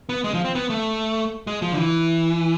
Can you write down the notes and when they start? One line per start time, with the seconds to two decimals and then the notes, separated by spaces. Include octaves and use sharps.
0.09 B3
0.24 G#3
0.34 F3
0.45 C4
0.55 B3
0.70 A3
1.47 G#3
1.62 F3
1.72 D3
1.78 E3